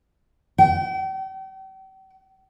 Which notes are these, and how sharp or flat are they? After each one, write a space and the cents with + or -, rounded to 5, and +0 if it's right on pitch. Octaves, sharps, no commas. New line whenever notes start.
G5 -40